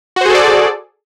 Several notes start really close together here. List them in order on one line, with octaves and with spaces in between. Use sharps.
F#4 C5 G#4 A4 D5